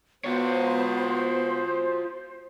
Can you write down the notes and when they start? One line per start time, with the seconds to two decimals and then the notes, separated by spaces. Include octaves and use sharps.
0.24 B3 F4 F#4 C5 C#5